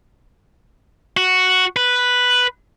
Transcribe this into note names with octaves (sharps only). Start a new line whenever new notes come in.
F#4
B4